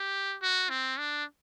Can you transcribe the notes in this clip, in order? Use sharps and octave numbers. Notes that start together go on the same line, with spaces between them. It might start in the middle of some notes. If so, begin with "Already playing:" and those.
Already playing: G4
F#4
C4
D4